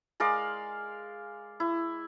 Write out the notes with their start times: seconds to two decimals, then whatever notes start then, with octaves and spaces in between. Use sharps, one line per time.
0.20 G#3 A#4 D5 F5
1.60 E4